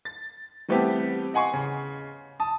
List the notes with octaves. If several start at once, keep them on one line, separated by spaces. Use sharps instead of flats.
A6
E3 G3 A3 B3 C4 G4
D#5 F#5 G#5 C6 C#6
C#3
A5 D#6